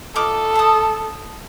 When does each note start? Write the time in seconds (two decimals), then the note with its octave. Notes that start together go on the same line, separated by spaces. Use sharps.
0.16 F4 A4 D#5 D6
0.55 A5 D#6